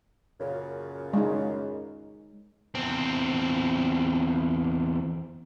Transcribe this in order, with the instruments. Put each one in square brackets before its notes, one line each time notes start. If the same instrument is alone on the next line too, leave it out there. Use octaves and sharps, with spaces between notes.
[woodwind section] F#2 A#2 C#3
[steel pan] G#3 D#4
[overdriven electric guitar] E2 C4